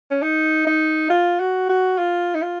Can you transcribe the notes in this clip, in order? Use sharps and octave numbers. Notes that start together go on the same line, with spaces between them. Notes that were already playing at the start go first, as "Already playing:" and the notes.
C#4
D#4
D#4
F4
F#4
F#4
F4
D#4
F4